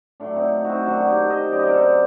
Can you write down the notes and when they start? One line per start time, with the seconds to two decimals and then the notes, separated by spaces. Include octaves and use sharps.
0.20 A2 F#3 D4
0.36 C4 D#4
0.65 C4 D#4 F#4
0.86 F#2 D#3 F#3 D4 F#4
0.98 F#4
1.08 D#4 G4
1.30 C5 D#5
1.52 F#2 F#3 D5
1.59 D#5
1.67 A#4 D5
1.74 A4 C5